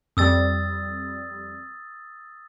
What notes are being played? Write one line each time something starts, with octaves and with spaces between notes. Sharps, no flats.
F2 G3 D#6 E6 A6